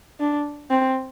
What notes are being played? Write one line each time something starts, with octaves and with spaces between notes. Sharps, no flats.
D4
C4